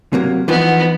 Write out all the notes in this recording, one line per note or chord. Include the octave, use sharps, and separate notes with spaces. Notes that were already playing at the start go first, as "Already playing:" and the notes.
C3 F#3 A#3
E3 F3 B3 D#4